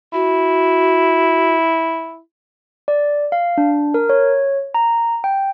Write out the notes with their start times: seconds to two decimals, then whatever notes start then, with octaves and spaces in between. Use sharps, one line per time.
0.13 E4 F#4
2.88 D5
3.32 F5
3.58 D4
3.94 A#4
4.09 C#5
4.74 A#5
5.24 G5